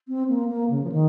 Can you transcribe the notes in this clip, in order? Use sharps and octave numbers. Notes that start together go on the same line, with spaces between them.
C4
A#3
A#3
C#3
F3
D#3